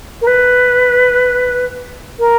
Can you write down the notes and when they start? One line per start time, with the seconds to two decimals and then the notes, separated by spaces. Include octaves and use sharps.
0.21 A#4
0.27 B4
2.19 A#4